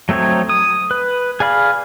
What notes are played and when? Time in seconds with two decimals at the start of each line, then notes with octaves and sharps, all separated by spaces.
0.09 F#3 A3 C4 D#4 C#5
0.49 D#6
0.91 B4
1.40 G#4 D5 F5 B5